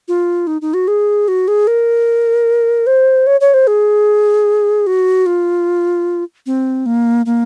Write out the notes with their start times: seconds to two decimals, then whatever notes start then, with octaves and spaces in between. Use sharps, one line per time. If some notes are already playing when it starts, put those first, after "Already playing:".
0.08 F4
0.47 D#4
0.62 D#4
0.74 F#4
0.88 G#4
1.28 F#4
1.48 G#4
1.67 A#4
2.87 C5
3.27 C#5
3.41 C#5
3.54 C5
3.67 G#4
4.87 F#4
5.26 F4
6.46 C4
6.86 A#3
7.26 A#3